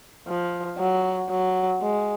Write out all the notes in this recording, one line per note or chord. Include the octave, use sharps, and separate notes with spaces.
F3
F#3
F#3
G#3